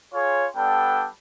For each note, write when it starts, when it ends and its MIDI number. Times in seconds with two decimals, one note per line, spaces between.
0.14 0.46 65
0.14 0.46 68
0.14 0.46 73
0.56 1.07 55
0.56 1.07 59
0.56 1.07 62
0.56 1.07 69
0.56 1.07 79